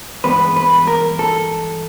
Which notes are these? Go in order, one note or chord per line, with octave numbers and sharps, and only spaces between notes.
G2 E3 G#3 B3 B4
B4
A#4
A4